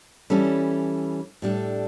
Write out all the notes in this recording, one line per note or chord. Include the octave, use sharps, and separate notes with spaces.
E3 G3 C#4 E4 A4
A2 G3 D4 A4